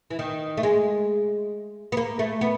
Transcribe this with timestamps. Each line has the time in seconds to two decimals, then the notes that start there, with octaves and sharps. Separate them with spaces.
0.10 E3
0.19 D#3
0.57 A3
0.63 G#3
1.92 B3
1.97 A#3
2.19 A3
2.41 B3